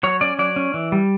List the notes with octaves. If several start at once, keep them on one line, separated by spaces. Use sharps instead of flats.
F#3 C#5
C#4 D5
F#3 D5
C#4
E3
G3